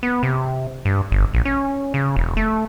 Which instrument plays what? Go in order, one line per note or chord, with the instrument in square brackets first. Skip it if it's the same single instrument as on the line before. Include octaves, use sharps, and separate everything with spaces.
[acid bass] B3
C3
G2
G1
A#1
C#4
C#3
E1
A3